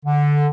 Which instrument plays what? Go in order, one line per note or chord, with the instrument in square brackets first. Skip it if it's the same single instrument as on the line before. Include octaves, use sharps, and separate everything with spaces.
[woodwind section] D3